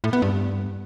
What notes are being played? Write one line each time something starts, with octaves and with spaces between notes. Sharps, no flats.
A2
B3
G2